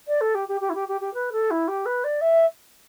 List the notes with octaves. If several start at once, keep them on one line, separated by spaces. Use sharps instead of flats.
D5
A4
G4
G4
G4
E4
G4
G4
G4
B4
A4
E4
G4
B4
D5
E5